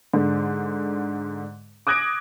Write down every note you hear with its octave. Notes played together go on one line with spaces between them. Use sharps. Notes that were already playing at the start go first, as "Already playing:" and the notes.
G#2 D3
D6 D#6 F#6 G#6 A#6 D7